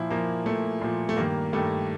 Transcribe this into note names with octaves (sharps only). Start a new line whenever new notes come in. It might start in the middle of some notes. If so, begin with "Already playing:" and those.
Already playing: A#2 F3 E4
A#2 F3 A#3
A#2 F3 A3
A#2 F3
A3
G2 D#3 A#3
G2 D#3 A3